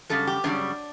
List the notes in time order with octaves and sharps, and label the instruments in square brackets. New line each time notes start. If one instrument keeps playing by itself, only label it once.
[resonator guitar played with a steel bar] F#2 C#3 G3 A4
G4
F#2 C#3 G3 D4